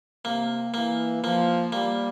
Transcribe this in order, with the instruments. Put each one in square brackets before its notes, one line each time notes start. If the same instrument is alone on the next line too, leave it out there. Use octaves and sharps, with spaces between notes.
[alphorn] C3 [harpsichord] A#3
[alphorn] E3 [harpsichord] A#3
[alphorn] F3 [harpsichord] A#3
[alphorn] G3 [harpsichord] A#3